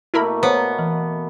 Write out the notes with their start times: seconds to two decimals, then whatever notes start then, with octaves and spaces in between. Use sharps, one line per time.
0.14 B2 A3 A#3 E4 A#4 B5
0.43 B3 C5 C#5 A#5
0.79 E3